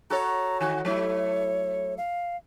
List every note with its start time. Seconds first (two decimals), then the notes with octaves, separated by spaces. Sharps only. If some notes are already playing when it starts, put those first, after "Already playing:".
0.10 F#4 A4 C#5 A#5
0.61 D#3 F#4 G#5
0.85 F#3 A3 E4 C#5
1.98 F5